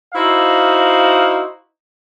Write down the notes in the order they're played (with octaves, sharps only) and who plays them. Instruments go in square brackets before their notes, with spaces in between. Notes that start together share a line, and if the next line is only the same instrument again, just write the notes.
[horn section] D#4 E4 F#4 C5 F5